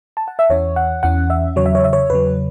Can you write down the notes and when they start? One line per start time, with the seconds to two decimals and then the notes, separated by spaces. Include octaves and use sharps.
0.17 A5
0.28 F#5
0.39 E5
0.50 E2 E3 C#4 C#5
0.76 F#5
1.03 E2 E3 C#4 F#5
1.30 E5
1.56 E2 C#3 F#3 C#5
1.66 E5
1.75 C#5
1.84 E5
1.93 C#5
2.10 E2 C#3 F#3 B4